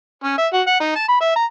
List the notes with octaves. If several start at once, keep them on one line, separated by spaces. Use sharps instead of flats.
C#4
E5
F#4
F#5
D#4
A5
B5
E5
A#5